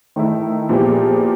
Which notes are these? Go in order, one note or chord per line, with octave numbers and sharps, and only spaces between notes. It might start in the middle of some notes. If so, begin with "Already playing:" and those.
D#3 A3 D#4 E4
A#2 F3 B3 E4 G4 G#4